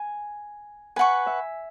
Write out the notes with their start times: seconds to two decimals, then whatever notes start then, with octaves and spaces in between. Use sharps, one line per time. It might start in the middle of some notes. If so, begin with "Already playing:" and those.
Already playing: G#5
0.96 B4 F#5 G#5 C#6
1.26 E5